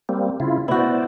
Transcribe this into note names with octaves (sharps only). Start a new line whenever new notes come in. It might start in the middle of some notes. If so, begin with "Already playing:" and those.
G3 A#3 C4
C#3 E4 F4
B3 E4 F#4 C5 D5